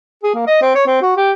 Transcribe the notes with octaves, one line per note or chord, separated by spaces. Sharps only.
G#4
A#3
D#5
C4
C#5
C4
F#4
G4